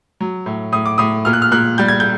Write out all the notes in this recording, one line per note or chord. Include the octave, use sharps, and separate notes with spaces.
F#3
A2
A2 D#6
D6
A2 D#6
A#2 F6
F#6
F6
A#2 F#6
G3 G6
G#6
G6